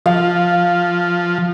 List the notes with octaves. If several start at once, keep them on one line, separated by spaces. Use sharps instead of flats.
F3 F5